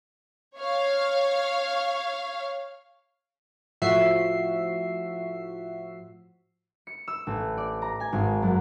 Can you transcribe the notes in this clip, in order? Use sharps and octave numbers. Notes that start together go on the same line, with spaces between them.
C#5 F5
A2 F3 F#4 E5 C7
C#7
E6
A1
D5
A#5
G#5
G#1
F#2